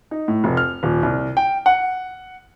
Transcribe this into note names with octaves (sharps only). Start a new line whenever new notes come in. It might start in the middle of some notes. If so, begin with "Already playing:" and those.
D#4
A2
F1
F6
D#1
C2
G5
F#5